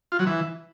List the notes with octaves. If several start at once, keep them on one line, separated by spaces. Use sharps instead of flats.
F4
F#3
E3